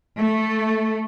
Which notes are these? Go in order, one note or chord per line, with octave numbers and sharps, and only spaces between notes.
A3